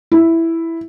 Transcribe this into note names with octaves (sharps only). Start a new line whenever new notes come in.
E4